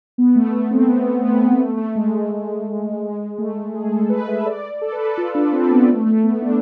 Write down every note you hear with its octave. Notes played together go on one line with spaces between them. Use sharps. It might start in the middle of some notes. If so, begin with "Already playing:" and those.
B3
A3
A3
C4
B3
B3
A3
A3
G#3
A3
G#3
A3
G#4
A4
B4
E5
D5
A4
B4
A4
F4
D4
C4
B3
A3
A3
B3
D4